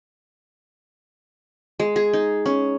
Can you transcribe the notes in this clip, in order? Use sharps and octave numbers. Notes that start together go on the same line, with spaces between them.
G#3
G#4
D#4
C#4